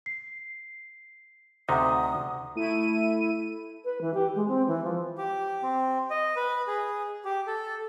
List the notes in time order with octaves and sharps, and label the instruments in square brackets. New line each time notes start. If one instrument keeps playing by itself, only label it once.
[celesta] C7
[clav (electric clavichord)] D2 C3 D#4 [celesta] F#5 A#5 [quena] D#6
[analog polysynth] A3 E4 D#7
[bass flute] B4
E3
G4
G#3
C4
E3
F3
[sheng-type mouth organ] G4
C4
D#5
B4
G#4
G4
A4